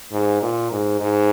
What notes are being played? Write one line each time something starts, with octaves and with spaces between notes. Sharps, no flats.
G#2
A#2
G#2
G#2